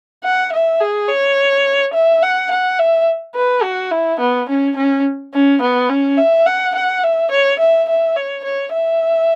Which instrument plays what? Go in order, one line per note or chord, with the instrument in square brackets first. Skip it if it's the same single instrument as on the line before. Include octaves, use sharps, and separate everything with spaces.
[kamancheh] F#5
E5
G#4
C#5
E5
F#5
F#5
E5
B4
F#4
E4
B3
C#4
C#4
C#4
B3
C#4
E5
F#5
F#5
E5
C#5
E5
E5
C#5
C#5
E5